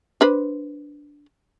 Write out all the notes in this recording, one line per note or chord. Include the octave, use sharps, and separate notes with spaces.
D4 B4 C5